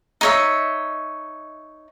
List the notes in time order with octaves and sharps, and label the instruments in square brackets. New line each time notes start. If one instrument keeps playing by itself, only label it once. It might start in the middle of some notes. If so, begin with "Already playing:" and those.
[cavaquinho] D#4 C#5 E5